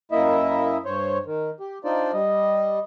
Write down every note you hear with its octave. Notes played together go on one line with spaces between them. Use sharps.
F#2 A#3 E4 D#5 E5
G2 C5 C#5
D#3
G4
D4 D#4 F4 C5 D5
G3 D#5